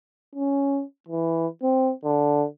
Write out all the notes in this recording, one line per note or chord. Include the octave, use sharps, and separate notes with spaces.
C#4
E3
C4
D3